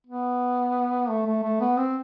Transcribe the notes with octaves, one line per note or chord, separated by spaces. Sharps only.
B3
A3
A3
A3
B3
C4